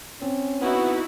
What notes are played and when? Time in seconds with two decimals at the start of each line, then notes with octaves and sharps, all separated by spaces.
0.22 C4 C#4
0.62 B3 D#4 E4 F#4